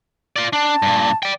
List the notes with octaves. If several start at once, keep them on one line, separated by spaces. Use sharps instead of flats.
F4 D5
D4 A5
G2 A#2
D5 G5